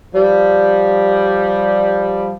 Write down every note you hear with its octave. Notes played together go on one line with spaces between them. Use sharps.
F3 G3